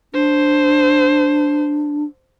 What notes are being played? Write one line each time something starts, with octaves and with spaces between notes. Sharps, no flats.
D4 C5